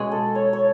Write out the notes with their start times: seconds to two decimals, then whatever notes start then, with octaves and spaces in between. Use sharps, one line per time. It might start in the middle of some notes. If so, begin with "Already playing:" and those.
Already playing: B2 G#3 C#4
0.12 A4
0.35 C#5
0.53 C#5